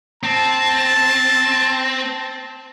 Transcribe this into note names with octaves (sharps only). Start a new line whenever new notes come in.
C4 A5